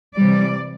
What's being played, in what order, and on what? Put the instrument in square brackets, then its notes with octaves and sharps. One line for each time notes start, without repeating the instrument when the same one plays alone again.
[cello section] C3 E3 G3 D5